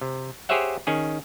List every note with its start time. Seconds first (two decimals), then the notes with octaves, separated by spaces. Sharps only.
0.01 C3
0.49 G4 G#4 C5 C#5 E5 F#5
0.87 D#3 C#4 G#4